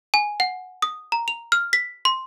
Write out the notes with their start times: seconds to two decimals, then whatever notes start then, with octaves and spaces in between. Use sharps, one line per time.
0.14 G#5
0.40 F#5
0.82 D#6
1.12 A#5
1.28 F7
1.52 F6
1.73 B6
2.05 C6